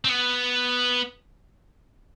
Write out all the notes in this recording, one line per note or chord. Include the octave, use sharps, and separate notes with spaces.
C4
B3